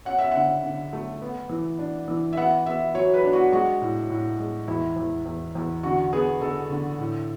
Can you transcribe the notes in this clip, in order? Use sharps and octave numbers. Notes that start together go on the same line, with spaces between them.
C#4 F#5
E5
D3 F#5
D3
A3
B3
E3
D4
E3
E5
B3 F#5
B3 E5
F#3 C#5
B4
D4
F#4
G#3 F#4
A2
A2
G#3
E2 E4
E2
E2
E2
D3 F#4
B3 G#4
D3 A4
D3
A2